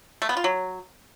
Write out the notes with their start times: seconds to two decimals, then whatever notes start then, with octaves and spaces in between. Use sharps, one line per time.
0.22 A3
0.29 B3
0.37 F4
0.44 F#3